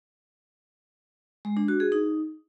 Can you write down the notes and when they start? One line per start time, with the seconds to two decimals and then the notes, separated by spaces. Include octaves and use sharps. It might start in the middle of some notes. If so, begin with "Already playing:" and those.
1.45 G#3
1.57 D4
1.68 F#4
1.80 G#4
1.92 D#4